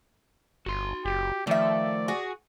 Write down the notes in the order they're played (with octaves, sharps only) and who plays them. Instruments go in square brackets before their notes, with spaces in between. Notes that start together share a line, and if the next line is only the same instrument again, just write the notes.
[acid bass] G1 [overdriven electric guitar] F#4 C6
[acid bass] F#1 [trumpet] G4
[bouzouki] D#3 E5 [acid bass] F3 [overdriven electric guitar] A3 [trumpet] D5
[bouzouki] F#4 G#4